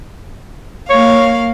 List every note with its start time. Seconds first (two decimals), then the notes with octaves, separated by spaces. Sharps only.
0.90 A#3 C#5 F5